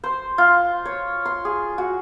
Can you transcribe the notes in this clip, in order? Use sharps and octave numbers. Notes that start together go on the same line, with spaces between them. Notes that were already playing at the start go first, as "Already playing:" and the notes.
C5
F4
C#5
C6
G#4
F#4